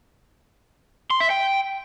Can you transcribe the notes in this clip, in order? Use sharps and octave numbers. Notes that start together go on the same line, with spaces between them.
C6
E5
G5